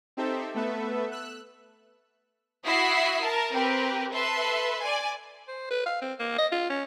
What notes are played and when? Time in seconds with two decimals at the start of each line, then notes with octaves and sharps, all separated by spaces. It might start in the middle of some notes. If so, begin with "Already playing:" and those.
0.17 C4 D#4 G4 A4 C5 E5
0.54 A3 B3 A4 B4 E5
1.11 E6 F#6
2.64 E4 F#4 E5 D#6 B6 C7
3.21 A#4 A5
3.53 C4 G4 A#4 B4
4.12 A4 B4 E5 C6
4.81 D5 G#5
5.48 C5
5.71 B4
5.86 F5
6.02 C4
6.19 A#3
6.38 D#5
6.52 F4
6.69 C#4